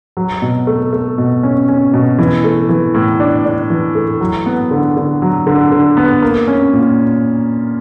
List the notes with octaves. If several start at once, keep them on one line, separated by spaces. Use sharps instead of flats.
F#3
B2
A3
A3
B2
C#4
C#4
B2
E3
A3
E3
A2
D4
D4
E3
A3
F#3
B3
D3
D3
F#3
D3
D3
B3
A#3
C#4
A#2